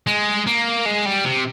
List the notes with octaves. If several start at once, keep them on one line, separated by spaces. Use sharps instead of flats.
G#3
A#3
G#3
G3
C3